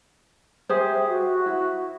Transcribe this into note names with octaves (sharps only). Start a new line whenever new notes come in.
G4 G#4 C5 E5
F#4
E4